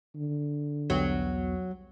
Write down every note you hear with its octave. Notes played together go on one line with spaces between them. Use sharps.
D3
B1 E2 F#3 B3